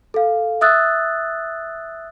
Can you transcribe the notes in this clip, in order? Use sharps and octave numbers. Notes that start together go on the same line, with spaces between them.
A4 F5
E5 D#6 E6 F#6 A6